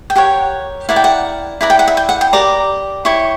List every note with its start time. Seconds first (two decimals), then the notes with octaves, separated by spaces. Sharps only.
0.10 G5
0.16 G4 A#4 C#5 F#5
0.89 E4 A#4 D5 F#5
0.96 G5
1.04 F#5
1.61 E4 B4 D5 A#5
1.70 G5
1.79 F#5
1.88 E5
1.97 G5
2.09 F#5
2.21 G5
2.33 G4 A#4 D5 A#5
3.05 E4 G4 C#5 C#6